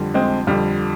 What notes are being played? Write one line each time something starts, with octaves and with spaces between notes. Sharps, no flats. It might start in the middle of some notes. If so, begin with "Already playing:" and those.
Already playing: F2 D3 G3
G#3 C4
F2 D3 G3